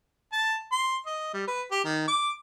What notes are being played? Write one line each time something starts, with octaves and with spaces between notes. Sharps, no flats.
A5
C6
D#5
G3
B4
G4
D#3
D6